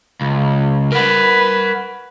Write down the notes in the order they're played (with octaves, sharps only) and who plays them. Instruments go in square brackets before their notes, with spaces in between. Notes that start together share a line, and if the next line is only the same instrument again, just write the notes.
[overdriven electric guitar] C#2
[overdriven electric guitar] A#4 F#5 [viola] B4